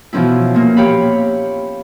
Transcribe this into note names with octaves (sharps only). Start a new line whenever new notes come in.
B2 E3 F3 C#4 E4
A#2 A#3
G4 C#5 F5 B5